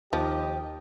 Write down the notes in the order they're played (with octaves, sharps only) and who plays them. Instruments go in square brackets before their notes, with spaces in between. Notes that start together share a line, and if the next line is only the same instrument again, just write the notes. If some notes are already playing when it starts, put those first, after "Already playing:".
[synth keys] D#2 [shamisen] F3 [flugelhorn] G4 [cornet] D#5